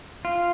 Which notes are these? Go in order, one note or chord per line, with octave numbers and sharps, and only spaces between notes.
F4